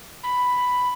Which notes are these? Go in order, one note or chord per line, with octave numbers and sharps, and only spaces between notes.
B5